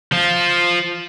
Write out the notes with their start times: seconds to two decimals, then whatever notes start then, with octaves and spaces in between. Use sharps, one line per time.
0.12 F3 F4